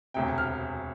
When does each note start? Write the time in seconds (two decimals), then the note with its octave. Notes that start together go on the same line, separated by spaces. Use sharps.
0.14 E1 D2 C3 G5
0.38 F6